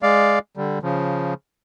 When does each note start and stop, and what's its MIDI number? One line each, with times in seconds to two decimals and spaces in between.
0.03 0.39 56
0.03 0.39 74
0.03 0.39 77
0.57 0.79 50
0.57 0.79 55
0.83 1.34 49
0.83 1.34 53